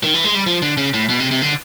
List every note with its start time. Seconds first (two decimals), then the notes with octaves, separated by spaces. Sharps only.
0.04 D#3
0.14 E3
0.25 G#3
0.35 G3
0.47 F3
0.62 D3
0.77 C#3
0.94 A2
1.09 B2
1.20 C3
1.31 C3
1.42 D3